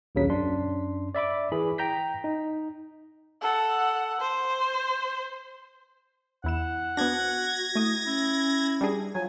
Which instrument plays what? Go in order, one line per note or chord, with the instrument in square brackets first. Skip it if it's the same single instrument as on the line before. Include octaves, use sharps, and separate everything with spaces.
[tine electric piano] A#1 D#2 C#3 F#3 B6
F#2 D4 C6
D5 E5 B5 D6
E3 G#4 B5
G5 A#5 G6 B6
D#4
[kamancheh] A4 F#5
C5
[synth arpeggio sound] E2 E4 E7 [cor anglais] F#5
[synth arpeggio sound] B3 C4 D4 [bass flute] F#4 [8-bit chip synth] G#6 A#6
[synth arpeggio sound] A3 D#6 [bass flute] E4
[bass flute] C#4 [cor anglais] E4
[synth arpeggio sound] G3 D4 G#4
[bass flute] F3 [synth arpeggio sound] F#3 [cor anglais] G#5